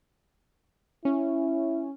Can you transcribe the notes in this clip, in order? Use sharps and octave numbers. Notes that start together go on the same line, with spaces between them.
C#4 E4